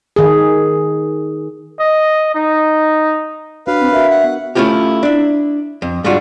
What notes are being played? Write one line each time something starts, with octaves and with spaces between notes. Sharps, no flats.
D#3 G#4
D#5
D#4
D4 F#4 B4 C#5 F5
C4
F#4 A#4 E5
F#5
B3
A3 C#4 E4 F4 G4
D4 E4
F2
G#2 G3 D4 F4 F#4